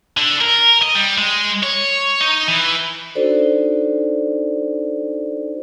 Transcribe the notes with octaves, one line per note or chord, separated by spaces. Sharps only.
D3
A#4
D#5
G3
G#3
C#5
D#4
E3
D4 D#4 F#4 A4 C5 D5